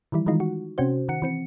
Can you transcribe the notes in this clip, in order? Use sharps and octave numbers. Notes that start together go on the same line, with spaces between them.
D#3 E3 G3 E4
D#3 E3 G#3 D#4 F4
F#4
C3 C#4 F#4 C5
D#3 F#5 C#7
E3 C4 C#7